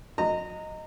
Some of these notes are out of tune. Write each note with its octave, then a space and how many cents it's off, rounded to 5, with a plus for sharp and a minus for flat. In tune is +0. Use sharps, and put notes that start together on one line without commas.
F#3 -40 D#5 +0 A#5 -20